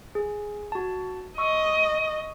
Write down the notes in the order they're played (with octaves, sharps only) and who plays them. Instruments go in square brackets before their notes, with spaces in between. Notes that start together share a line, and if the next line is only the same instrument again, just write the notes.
[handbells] G#4
F#4 A5
[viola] D#5 [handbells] C#6 E6